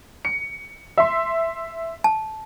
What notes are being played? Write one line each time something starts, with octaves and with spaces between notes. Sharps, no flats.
C#7
E5 C6
A5